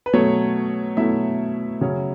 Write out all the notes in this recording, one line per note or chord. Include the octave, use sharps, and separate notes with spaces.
B4
B2 F#3 A3 C#5
B2 F#3 A3 E4 E5
C#3 F#3 C#4